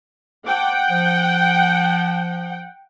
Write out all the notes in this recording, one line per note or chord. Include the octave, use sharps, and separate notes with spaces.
C5 F#5 G5 A5 D6
F3